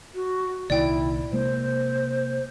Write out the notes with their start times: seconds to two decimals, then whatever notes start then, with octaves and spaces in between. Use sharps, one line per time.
0.15 F#4
0.70 C2 A#2 D#3 E4 D5 G5
1.33 C3 G#3 A#3 C5